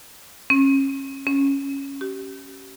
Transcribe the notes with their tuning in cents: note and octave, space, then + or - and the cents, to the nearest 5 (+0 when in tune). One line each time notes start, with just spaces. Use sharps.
C#4 -30
C#4 -5
G4 -35